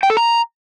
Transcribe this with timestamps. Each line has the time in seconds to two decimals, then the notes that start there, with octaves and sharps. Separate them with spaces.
0.03 G5
0.10 A4
0.17 A#5